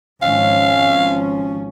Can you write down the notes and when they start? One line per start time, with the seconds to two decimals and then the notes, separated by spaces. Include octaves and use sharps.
0.22 G#1 F3 C#4 F5